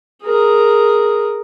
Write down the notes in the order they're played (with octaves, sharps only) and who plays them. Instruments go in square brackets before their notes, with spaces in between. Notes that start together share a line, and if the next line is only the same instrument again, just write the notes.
[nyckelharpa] G#4 A#4